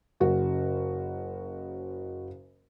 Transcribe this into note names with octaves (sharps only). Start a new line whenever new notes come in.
F#1 C#3 F#4